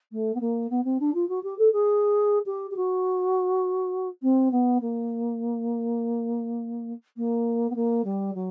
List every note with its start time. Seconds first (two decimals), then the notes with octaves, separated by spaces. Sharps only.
0.12 A3
0.34 B3
0.40 A#3
0.70 B3
0.84 C4
1.00 D4
1.14 F4
1.29 F#4
1.43 G4
1.58 A4
1.72 G#4
2.46 G4
2.71 G4
2.76 F#4
4.22 C4
4.51 B3
4.81 A#3
7.17 A#3
7.70 B3
7.75 A#3
8.04 G3
8.34 F#3